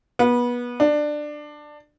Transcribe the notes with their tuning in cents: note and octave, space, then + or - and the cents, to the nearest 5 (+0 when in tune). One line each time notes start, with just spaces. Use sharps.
B3 -25
D4 +15